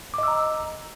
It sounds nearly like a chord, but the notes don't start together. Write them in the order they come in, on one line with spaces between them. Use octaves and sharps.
D6 D#5 E6 A#5